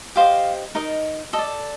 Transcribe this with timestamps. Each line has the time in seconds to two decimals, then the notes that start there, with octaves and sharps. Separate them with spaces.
0.15 G4 C5 D#5 F5
0.75 D#4 A#4 D#5
1.33 A4 D#5
1.38 D5